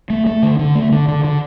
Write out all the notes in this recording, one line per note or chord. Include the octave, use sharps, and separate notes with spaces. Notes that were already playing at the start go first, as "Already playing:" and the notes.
A3
A3
D3
D3
A3
D3
D3
D3